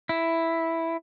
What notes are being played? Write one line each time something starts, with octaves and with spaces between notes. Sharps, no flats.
E4